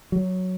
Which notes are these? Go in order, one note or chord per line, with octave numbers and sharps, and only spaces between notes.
F#3